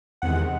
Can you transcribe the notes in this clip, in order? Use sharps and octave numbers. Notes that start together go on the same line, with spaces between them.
E2 C3 D#3 G#3 F#5